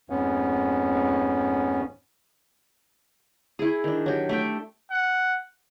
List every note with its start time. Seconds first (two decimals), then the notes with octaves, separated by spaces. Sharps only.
0.10 F2 G#2 B3 C#4
3.59 E4 G#4
3.84 D#3 D4
4.06 F#3 G4
4.29 A3 E5 G5
4.91 F#5